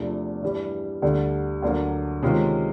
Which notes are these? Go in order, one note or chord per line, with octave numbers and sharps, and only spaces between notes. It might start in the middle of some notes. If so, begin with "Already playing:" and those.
Already playing: E2 C3 F3 A3 D4
G2 E3 G3
D2 D3 G3
D2 D3 F#3 A#3
C3 D#3 G#3 C#4 F4